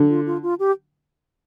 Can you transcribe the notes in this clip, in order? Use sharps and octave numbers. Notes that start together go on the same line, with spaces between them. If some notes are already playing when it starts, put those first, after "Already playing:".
Already playing: D3
F4
F4
F4
G4